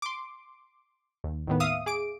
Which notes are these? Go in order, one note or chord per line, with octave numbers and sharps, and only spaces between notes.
C6 D6
D#2
D#2 A2 D#3 B3
E5 F5 D#6 D#7
G#4 D6 D7